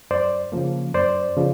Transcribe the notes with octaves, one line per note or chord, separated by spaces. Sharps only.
F#2 C5 D5
C#3 F3 A#3
F#2 C5 D5
C#3 F3